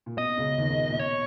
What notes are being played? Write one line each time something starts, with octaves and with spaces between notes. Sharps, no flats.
A#2
B2 D#5
B2
C#2 C#3
D#2 D#3
C#2 C#3
A#2
A#2
B2 C#5